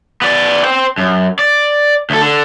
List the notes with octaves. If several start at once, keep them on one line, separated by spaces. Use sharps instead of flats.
B3 D5
C5 G5
F#2
D5
D2 A4
D3